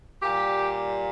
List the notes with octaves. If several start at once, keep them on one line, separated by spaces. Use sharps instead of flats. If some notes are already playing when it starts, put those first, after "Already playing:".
A#2 G3 G4